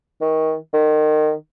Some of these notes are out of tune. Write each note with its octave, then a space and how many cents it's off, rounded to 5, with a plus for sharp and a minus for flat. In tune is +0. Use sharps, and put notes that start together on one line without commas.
D#3 +25
D#3 -25